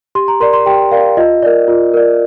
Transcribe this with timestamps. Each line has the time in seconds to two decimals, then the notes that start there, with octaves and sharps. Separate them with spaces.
0.15 G4 C6
0.28 A#5
0.40 A#4 D5 C6
0.53 C6
0.66 G4 G5
0.91 A#4 D5 F5
1.17 F4 D#5
1.43 A#4 D5
1.68 F4
1.94 A#4 D5